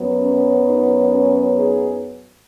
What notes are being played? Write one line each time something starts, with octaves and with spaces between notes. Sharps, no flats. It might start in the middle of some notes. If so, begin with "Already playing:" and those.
Already playing: F#2 F#3 B3
C#4
D#4
C#4 F#4
D#4 G#4